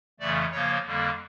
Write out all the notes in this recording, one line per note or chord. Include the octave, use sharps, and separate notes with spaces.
F2 C#3 E3 A3 D5
C#3 F3 A#3 C#5
F2 D3 G3 A#3